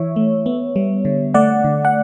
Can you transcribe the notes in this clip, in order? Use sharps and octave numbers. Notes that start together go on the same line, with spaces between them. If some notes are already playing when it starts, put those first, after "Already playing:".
Already playing: E3 C#5 E5
A3
B3
G3
D3
A3 D5 F#5
D3
F#5